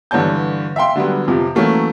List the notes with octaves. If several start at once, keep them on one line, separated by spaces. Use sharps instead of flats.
G2 D3 E3 C#5 A5 G6
E5 F5 G5 C6
D3 F#3 G3 B3
F2 C3 F3
E3 F#3 A3 A#3 C#4